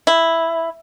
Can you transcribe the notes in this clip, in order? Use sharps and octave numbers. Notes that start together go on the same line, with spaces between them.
E4